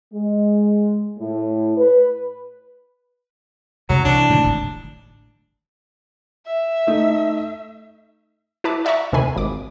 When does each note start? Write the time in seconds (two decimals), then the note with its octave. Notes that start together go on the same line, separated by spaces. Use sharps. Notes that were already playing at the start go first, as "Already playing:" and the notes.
0.13 G#3
1.19 A2
1.78 B4
3.90 C2 C#3 F#3
4.05 C3 E3 D4
4.30 A2 C3 D#3
4.44 D1 G#1
6.47 E5
6.87 A3 D#4
8.64 E4 B4 A5 D6
8.85 D5 E5 F#5 A#5 C#6
9.12 D2 C3 D#3 G#5 B5
9.36 G#1 D6